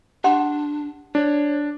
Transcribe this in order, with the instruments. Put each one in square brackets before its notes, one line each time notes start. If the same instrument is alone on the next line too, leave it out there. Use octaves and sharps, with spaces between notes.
[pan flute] D4 [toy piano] G4 F#5 C6
[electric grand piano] D4 [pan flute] C#5